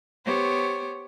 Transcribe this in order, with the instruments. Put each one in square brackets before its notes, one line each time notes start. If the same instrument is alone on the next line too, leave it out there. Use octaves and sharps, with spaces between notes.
[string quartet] B3 G4 C5 C#5